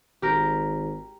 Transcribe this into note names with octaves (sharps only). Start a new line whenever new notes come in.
G#1 G4 A#4